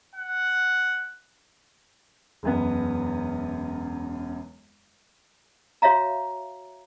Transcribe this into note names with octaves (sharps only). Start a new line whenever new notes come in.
F#5
E1 F#2 B3
F#4 C#5 E5 F5 A#5